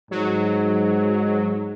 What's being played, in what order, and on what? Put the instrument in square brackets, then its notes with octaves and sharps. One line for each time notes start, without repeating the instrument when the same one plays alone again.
[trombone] G#2 [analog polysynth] F#3